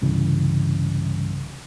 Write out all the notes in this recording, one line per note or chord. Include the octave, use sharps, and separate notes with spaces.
C2 G2 C#3 E3